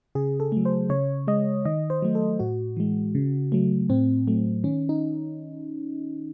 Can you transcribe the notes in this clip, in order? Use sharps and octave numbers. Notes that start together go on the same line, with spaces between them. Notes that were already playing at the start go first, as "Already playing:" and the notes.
C#3 G#4
A4
F#3 A3
C5
C#3 C#5
G#3 D#5
D#3 D#5
C5
F#3 A3
A4
A2 F#4
E3 G#3
C#3
F#3 A3
A2 C4
F#3 A3
D#3 C#4
D#4